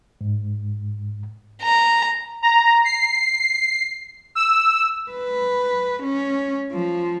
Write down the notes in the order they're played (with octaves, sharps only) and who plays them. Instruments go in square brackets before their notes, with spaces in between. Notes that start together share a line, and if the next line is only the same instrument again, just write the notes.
[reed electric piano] G#2
[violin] A#5
[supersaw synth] A#5
C7
E6
[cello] B4
C#4
F3